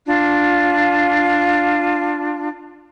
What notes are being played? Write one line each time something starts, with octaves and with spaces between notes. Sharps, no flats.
D4 F4